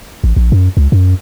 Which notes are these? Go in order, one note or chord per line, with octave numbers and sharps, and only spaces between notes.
A1
A#1
F#2
C#2
F#2